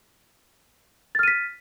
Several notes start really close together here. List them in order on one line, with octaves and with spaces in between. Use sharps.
A6 F6 D#7 B6